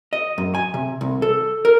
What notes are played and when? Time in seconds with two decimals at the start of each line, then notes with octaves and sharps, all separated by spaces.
0.13 D#5
0.38 F#2
0.55 G#5
0.74 C3
1.01 C2
1.22 A4
1.65 A#4